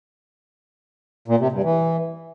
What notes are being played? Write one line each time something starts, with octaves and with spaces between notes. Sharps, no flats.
A#2
C3
G2
E3